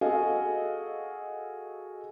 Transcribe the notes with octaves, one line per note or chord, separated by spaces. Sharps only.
F#4 G#4 A4 D#5 F5